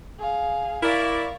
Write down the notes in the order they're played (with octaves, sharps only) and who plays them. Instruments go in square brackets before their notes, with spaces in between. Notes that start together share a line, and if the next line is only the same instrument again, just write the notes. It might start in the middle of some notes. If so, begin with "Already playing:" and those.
[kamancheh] G#4 F5
[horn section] E4 A#4 D5 [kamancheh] F5 C#6